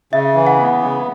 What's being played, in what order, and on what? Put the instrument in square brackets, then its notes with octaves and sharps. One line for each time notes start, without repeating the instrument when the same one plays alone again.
[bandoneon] C#3 [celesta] E5
[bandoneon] E3
[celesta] F#5
[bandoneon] B3
C#3